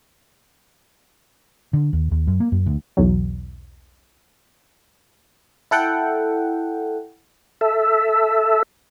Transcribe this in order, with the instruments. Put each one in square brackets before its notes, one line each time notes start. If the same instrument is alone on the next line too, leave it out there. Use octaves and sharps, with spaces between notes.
[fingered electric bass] D3
D#2
D#2
F#2
A#3
F#2
D2
[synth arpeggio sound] B1 E2 F#3
[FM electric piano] E4 A4 F#5 G5
[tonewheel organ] A4 E5